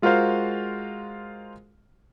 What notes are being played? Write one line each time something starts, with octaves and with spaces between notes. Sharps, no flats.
G#3 F4 F#4 A#4 C5 F5